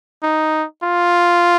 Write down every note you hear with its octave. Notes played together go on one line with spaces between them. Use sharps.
D#4
F4